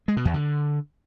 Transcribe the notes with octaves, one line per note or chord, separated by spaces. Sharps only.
G#3
B2
E2
D3